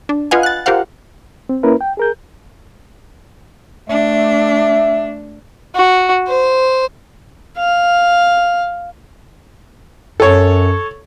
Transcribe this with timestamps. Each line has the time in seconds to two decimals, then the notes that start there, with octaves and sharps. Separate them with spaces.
0.09 D4
0.31 F4 B4 D#5 F5 F#5 G#5
0.43 F#6 A6
0.66 F4 G4 A#4 C5 F5 F#5
1.49 C4
1.63 A#3 C#4 E4 A#4 B4
1.81 G5
1.97 G#4 A#4 G6
3.89 A3 D4 E5
5.75 F#4
6.28 C5
7.57 F5
10.20 F#2 A4 C#5